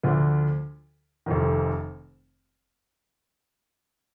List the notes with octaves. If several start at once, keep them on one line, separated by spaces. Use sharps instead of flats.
D2 D3 F3
F1 F2 D#3